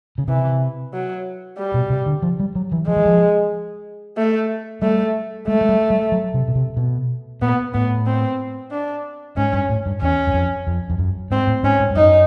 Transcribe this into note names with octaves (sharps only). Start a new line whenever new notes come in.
C#3
C3 E3
F#3
G3
B2
C3
D3
F3
G3
F#3
E3
F3 G#3
E3
F3
A3
G3 A3
G#3 A3
G#3
G3
G3
F#3
C3
B2
C3
B2
A#2 B3
A2 B3
C4
D4
G#2 C#4
G2
A2
G2
E2 C#4
F#2
F2
F2
F2
F#2
G#2 C4
A2
G#2 C#4
G#2
G2
F#2 D#4